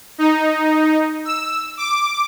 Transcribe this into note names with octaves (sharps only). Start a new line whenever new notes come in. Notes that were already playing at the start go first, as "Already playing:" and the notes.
D#4
E6
D6